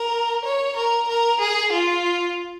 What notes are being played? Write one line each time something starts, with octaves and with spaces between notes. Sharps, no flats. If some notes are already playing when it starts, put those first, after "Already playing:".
Already playing: A#4
C#5
A#4
A#4
G#4
F4